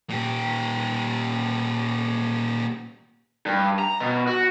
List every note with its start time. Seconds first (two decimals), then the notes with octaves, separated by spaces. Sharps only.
0.10 A#2 G4
3.46 G2
3.79 A#5
4.01 B2
4.27 F#4